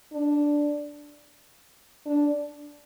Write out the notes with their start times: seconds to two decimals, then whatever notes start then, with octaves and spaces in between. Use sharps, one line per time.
0.13 D4
2.06 D4